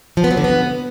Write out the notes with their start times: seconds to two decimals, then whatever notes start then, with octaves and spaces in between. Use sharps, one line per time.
0.17 F3
0.24 B3
0.31 F#3
0.37 D3
0.44 B3